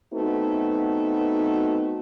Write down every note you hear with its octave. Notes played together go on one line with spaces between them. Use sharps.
A3 B3 C4 D#4 F#4 B4